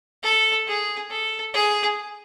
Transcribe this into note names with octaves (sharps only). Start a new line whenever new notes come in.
A4
G#4
A4
G#4